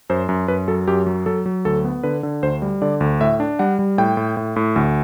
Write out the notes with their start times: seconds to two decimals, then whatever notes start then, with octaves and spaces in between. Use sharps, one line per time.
0.10 F#2 C5
0.29 F#2
0.48 F#2 B4
0.68 F#3 A4
0.87 F#2 G4
1.06 F#3
1.26 F#3 A4
1.46 F#3
1.65 D2 A4
1.85 B3
2.03 D3 B4
2.23 D3
2.43 D2 C5
2.62 G3
2.82 D3 D5
3.01 D2
3.20 A2 E5
3.40 D4
3.59 G3 F#5
3.79 G3
3.98 A2 G5
4.17 A2
4.37 A2
4.56 A2
4.76 D2